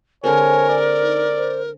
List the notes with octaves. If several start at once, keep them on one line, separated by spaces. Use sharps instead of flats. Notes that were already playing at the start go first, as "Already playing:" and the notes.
D3 G#3 C4 A#4 C#5 G#5
D5
D#4
C5